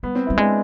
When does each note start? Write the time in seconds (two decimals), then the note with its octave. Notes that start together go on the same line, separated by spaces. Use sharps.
0.03 G3 B3
0.15 C4
0.27 G3 E4
0.38 G#3 D4